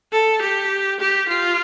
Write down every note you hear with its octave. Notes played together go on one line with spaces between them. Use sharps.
A4
G4
G4
F4